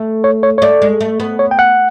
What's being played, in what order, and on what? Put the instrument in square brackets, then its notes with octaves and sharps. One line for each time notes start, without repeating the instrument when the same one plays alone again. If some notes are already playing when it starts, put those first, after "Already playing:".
Already playing: [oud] A3
[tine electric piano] C#5
C#5
C#5
[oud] A3 [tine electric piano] D5
[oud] G#3
A3
B3
[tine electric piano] C#5
G5
F#5